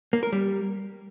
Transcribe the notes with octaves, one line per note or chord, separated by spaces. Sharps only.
A#3
A#4
G3